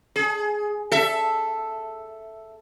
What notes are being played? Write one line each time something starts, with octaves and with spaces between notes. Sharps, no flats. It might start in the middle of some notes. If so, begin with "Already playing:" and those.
G#4
A4 E5